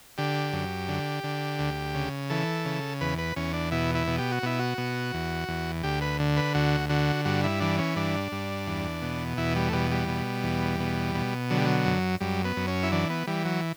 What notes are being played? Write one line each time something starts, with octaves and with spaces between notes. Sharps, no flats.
D3 G4
F#2
D3
D3
D2
C#3
E3 A4
C#3
E2 B4
B4
E2 C#4
D4
B2 E4
E4
B2
G4
F#4
B2 E4
F#4
B2
E2
E2
D2 G4
B4
D3
B4
D2 F#4
D3 F#4
G2 F#4
E4
E3 D4
C#4
G2 D4
G2
E2
B2
E2 E4
G3
A3
B2 G3
G3
B2
E2
B2
B2
D3 F#3
G3
F#3
F#2
F#2 G3
B3
F#2
C#4
E4
E3 D4
B3
E3 G3
F#3